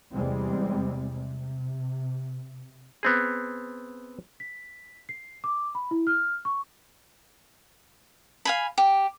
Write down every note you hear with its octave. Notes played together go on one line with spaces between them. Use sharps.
E2 C3 G3 G#3 C4
C3
B3 C4 G#4
B6
C7
D6
B5
E4
F6
C#6
F5 G#5 B5
G4